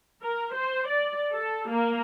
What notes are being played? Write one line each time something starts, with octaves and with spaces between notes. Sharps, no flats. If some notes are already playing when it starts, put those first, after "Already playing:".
A#4
C5
D5
A4
A#3